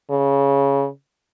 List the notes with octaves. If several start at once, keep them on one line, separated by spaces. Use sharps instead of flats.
C#3